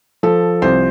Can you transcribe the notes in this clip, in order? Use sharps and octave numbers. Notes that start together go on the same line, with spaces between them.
F3 A4
C2 C5